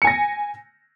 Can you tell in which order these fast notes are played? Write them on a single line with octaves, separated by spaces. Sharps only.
C#7 G#5 A#6